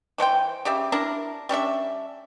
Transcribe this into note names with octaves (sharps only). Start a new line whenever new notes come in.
E3 A3 C5 G5
C#3 G4 D5 E5
D4 E4 A#4
G3 C#4 D4 E5